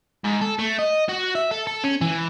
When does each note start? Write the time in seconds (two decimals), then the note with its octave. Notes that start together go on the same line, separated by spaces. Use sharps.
0.25 G#2
0.42 A4
0.59 A3
0.79 D#5
1.09 F#4
1.35 E5
1.51 A4
1.67 A4
1.84 C#4
2.01 E3